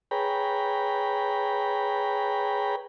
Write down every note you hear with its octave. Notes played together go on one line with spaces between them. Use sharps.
G#4 B4 C#5 G5 A#5 B5